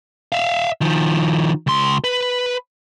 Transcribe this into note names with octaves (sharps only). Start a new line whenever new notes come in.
E5 F5
D#3 F3
C#2 C6
B4